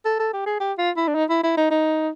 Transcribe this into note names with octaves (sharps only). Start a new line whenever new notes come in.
A4
A4
G4
G#4
G4
F4
E4
D4
D#4
E4
E4
D#4
D#4